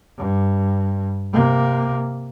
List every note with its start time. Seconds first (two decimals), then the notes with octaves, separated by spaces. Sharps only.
0.18 G2
1.33 C3 A#3